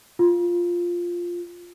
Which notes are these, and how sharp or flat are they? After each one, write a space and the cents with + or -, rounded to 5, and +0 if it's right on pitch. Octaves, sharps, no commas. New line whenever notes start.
F4 +0